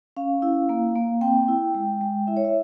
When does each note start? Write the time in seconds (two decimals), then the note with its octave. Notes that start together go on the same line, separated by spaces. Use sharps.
0.16 C#4 F5
0.42 E4
0.69 A#3
0.96 A#3
1.21 C4 G5
1.48 E4
1.75 G#3
2.01 G#3
2.27 E4 E5
2.37 C#5
2.44 E5